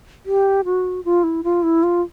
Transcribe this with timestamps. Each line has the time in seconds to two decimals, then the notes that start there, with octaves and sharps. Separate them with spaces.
0.26 G4
0.65 F#4
1.05 F4
1.23 E4
1.44 F4
1.63 E4
1.83 F4